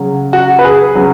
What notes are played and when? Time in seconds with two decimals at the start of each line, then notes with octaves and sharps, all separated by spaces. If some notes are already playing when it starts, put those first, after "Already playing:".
Already playing: C#3 F#3
0.33 F#4
0.59 B4
0.65 G#4
0.95 C#3 F#3